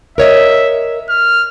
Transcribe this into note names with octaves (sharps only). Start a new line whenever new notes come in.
A#4 C#5 D#5 E5
F6